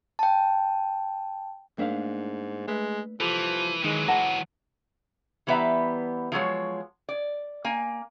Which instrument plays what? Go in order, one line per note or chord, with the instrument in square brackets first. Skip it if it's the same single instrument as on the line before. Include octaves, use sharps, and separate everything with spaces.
[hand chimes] G5 A5
[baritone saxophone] G#2 [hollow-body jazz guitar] A3 E5 F5 [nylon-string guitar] A#3 D4
[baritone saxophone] G#3 [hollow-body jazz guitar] A3 B4 E5
[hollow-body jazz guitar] C2 G4 A4 [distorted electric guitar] E3 [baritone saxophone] F3
[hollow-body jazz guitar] D#3 D#4 D#5 [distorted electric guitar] E3 F#3 [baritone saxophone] G#3
[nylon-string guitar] F#5 A5 [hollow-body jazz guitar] A#5
[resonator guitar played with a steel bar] E3 G3 B3 B4 E5 A#5
F3 F#3 G#3 C#5
D5
A#3 G#5